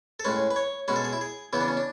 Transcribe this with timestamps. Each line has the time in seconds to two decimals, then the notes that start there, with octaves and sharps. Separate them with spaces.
0.20 A4
0.25 A2 G#3 C#4 B4
0.51 B4
0.56 C#5
0.88 B2 G#3 C#4 B4
0.96 A4
1.04 G#4
1.13 E4
1.21 G#4
1.53 C#3 E3 B3 E4
1.61 D4
1.68 C#4
1.77 D4